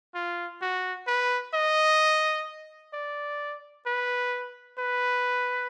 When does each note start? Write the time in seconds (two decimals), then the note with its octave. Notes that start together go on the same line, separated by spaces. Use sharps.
0.15 F4
0.62 F#4
1.07 B4
1.54 D#5
2.94 D5
3.86 B4
4.78 B4